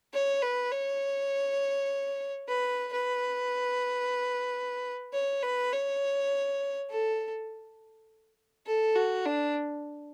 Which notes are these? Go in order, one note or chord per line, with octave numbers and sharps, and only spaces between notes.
C#5
B4
C#5
B4
B4
C#5
B4
C#5
A4
A4
F#4
D4